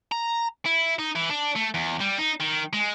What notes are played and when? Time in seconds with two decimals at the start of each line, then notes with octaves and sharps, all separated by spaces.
0.12 A#5
0.66 E4
0.99 D#4
1.15 E3
1.30 D4
1.56 A3
1.74 E2
2.01 G3
2.18 D#4
2.41 D#3
2.73 G#3